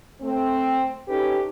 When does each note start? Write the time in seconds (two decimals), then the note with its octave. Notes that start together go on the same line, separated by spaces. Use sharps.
0.22 A3 C4
1.08 C#4 D#4 G4 A4 B4